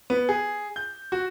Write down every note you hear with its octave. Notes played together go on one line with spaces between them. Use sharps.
B3
G#4
G6
F#4